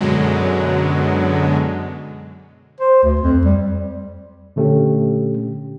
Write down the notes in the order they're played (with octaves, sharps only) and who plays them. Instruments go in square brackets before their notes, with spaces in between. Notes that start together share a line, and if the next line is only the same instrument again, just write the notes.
[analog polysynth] F#2 B2 D3 F#3 G#3
[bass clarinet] C5
D2
F2
G3
[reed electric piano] A#2 D3 A3 C#4 G4